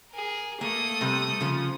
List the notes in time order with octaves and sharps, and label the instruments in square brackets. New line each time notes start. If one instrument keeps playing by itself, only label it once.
[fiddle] G#4 A#4
[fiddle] A3 D#6 [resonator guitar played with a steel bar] A#3
[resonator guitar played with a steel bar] C3 G3
C#3 F3